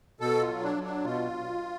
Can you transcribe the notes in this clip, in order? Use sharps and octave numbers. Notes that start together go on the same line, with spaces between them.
B2 A4
F4
F#3
D4
F#3
D4
B2 F4